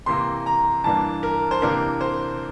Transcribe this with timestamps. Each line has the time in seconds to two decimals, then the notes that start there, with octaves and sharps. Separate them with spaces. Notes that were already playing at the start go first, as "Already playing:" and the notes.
0.06 C3 E3 A#3 C6
0.46 A#5
0.84 G2 E3 A#3 D4 A5
1.23 A#4
1.51 C5
1.62 C3 E3 A#3 D4 A#4
2.01 C5